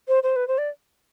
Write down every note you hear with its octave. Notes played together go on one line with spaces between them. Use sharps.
C5
C5
B4
C5
D5